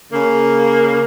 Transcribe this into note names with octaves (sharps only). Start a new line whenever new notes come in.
C#3 A#3